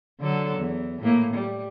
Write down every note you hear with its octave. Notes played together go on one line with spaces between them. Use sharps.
D3 F#3 A4
E2
A2 A#3
G3